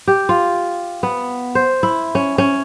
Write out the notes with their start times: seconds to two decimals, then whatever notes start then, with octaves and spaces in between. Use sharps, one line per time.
0.07 G4
0.29 F4
1.03 B3
1.55 C5
1.83 E4
2.15 C#4
2.38 C#4